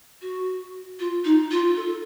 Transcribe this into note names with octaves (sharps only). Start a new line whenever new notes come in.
F#4
F4
D#4
F4
A4